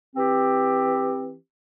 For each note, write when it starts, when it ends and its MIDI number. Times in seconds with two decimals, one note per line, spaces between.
0.16 1.35 52
0.16 1.35 60
0.16 1.35 67